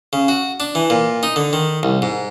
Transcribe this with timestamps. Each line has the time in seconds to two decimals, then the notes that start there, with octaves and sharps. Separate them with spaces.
0.13 C#3
0.28 F#4
0.60 D4
0.75 E3
0.90 A#2
1.23 D#4
1.36 D3
1.53 D#3
1.83 C2
2.02 G#2